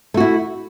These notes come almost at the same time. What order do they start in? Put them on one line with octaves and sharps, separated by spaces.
A3 F#4 E4